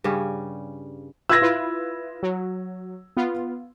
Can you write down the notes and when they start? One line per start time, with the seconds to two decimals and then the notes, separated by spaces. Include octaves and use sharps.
0.04 G2 C#3 G3 C#4
1.29 F4 B4 E5 E6 G#6 A#6
1.42 E4 F4 B4
2.23 F#3
3.17 B3 F4